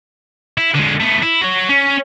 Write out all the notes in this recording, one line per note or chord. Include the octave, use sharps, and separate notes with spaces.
E4
D3 G#3
A3 B3
E4
F#4 C#5
C#4